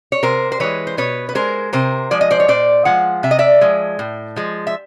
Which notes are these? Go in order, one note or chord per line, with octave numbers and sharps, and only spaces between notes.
C#5
C3 A#4 C5
C5
E3 G#3 B4 C#5
C5
B2 B4 C#5
B4
G#3 A#4 C5
C3 A#4 C5
F3 G#3 D5
D#5
C5 D5
C#5
A#2 C5 D5
F3 G#3 F#5
C3 E5
D#5
D5 E5
F3 G#3
A2
F3 G#3
E5